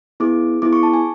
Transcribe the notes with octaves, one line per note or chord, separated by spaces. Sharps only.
B3 E4 G#4 D6
B3 E4 G#4 D6
C#6
A5
G#5